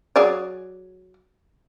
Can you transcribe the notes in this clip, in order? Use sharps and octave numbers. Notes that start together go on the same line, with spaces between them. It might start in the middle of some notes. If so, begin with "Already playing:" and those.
F#3 G#4 D5